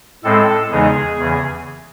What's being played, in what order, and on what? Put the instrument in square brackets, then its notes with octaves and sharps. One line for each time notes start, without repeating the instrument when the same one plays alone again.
[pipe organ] A2 G#3 C4 A4
E2 C#3 E3 G#3 D#4 G#4
E2 C#3 E3